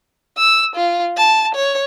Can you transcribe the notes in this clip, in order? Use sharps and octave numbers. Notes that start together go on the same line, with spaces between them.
E6
F4
A5
C#5